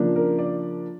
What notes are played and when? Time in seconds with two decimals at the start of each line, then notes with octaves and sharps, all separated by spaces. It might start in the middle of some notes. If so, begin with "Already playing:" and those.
Already playing: C#3 F3 A#3 D4
0.16 A#4
0.38 D5